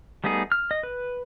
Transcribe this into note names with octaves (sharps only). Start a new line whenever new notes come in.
G3 A3 B3 D#4 G#4
F6
D#5
B4